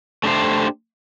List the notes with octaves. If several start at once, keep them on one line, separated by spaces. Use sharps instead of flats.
A3 D4 G4 C5